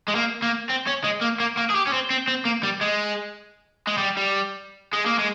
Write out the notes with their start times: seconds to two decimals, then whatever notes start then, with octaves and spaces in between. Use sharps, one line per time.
0.08 G#3
0.16 A#3
0.42 A#3
0.69 C4
0.87 C#4
1.04 G#3
1.22 A#3
1.40 A#3
1.57 A#3
1.70 G#4
1.75 G4
1.87 C#4
1.93 C4
2.10 C4
2.28 C4
2.45 A#3
2.63 G3
2.81 G#3
3.87 G#3
3.98 G3
4.17 G3
4.93 G#3
5.06 A#3
5.19 G#3